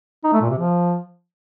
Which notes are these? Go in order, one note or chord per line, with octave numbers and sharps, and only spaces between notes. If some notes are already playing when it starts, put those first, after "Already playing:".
D#4
A3
A#2
C3
F3